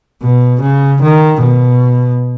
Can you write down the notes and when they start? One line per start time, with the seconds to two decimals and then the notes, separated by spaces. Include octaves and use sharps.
0.22 B2
0.62 C#3
1.02 D#3
1.41 B2